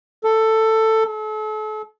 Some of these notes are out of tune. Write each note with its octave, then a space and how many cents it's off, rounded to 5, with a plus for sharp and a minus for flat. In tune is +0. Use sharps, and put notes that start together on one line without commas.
A4 +10
A4 -40